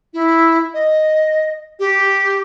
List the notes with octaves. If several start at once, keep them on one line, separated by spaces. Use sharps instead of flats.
E4
D#5
G4